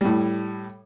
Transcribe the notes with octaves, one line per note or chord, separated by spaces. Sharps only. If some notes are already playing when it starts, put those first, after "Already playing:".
A2 G3